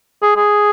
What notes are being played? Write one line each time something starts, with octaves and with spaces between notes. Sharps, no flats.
G#4
G#4